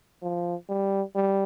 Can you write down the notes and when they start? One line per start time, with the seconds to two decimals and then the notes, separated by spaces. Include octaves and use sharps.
0.22 F3
0.69 G3
1.15 G3